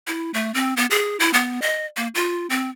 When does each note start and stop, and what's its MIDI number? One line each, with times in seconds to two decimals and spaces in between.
0.07 0.31 64
0.34 0.53 57
0.54 0.74 60
0.77 0.86 59
0.90 1.17 68
1.20 1.31 64
1.33 1.61 59
1.62 1.86 75
1.97 2.07 58
2.15 2.46 65
2.50 2.69 60